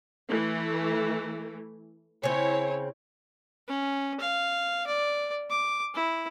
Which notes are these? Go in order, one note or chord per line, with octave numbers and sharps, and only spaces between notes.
E3 A3
C#3 C4 E4 C#5
C#4
F5
D5
D6
E4